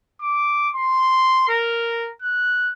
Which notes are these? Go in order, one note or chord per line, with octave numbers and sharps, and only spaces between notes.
D6
C6
A#4
F#6